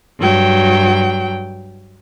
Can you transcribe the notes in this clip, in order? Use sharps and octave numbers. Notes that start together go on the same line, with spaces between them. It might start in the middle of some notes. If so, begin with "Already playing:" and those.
G2 F#3 G5